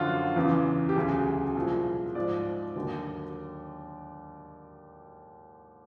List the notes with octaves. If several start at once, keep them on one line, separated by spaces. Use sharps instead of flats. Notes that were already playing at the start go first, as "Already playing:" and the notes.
Already playing: F#2 D3 F3 F4 F#4
E2 C#3 E3
G4
D2 C#3 F#3 G#4
C2 A#2 F3
G#2 F3 D5
D#2 D3 F#3